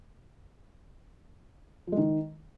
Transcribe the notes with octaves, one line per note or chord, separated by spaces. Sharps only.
F3
G#3
D#3